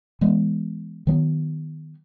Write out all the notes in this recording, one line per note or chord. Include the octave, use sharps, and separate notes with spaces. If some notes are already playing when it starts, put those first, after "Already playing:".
E3 G#3 B3
D#3 F#3 B3